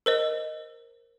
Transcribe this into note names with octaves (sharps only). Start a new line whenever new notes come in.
A#4 C5 D#5